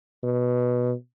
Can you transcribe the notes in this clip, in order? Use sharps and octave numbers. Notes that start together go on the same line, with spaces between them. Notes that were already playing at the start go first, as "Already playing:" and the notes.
B2